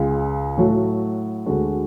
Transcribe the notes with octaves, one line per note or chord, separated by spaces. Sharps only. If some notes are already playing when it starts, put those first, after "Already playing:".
Already playing: C#2 C#3 G#3
A2 F#3 A3 F#4 A4
D2 D3 G#3 F#4 A4